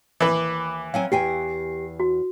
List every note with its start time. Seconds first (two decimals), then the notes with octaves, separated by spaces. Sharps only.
0.20 D#2 E3 B4 D6
0.94 F#3 C4 F5 G#5
1.12 E2 G4 G5 G#5 C7
2.00 F#4